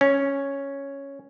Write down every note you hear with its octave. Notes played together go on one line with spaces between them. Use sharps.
C#4